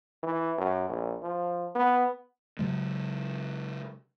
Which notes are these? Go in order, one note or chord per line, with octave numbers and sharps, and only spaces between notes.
E3
F#2
A#1
F3
B3
C#3 F#3 G#3